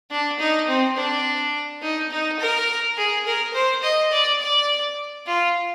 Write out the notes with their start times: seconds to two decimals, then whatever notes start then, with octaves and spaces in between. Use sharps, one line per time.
0.11 D4
0.39 D#4
0.67 C4
0.96 D4
1.82 D#4
2.11 D#4
2.39 A#4
2.97 G#4
3.26 A#4
3.54 C5
3.82 D#5
4.12 D5
4.40 D5
5.27 F4